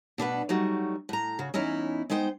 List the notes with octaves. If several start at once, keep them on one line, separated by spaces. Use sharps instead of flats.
B2 D4 B4 F#5
F#3 G3 A3 D#4 F#4
A2 A#5
C#3 F#4
E2 C#4 D#4 E4
G#3 B3 D#4 C5 G5